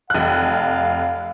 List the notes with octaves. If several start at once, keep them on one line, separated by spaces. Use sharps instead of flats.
F1 F5 F#6